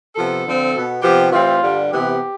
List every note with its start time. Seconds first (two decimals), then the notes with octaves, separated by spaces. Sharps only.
0.16 C3 F3 B3 A4
0.45 D3 F3 C4
0.73 B2 B3
1.02 C3 F3 B3 G4
1.32 A2 E3 G3 C4 F4
1.61 G2 D3 G3
1.89 C3 E3 B3 G4